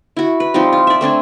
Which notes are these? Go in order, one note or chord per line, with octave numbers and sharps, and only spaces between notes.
E4 F#4
B4
F3 G3 C4 D#4
F4
D5 E5
A3 C4 D4 G#5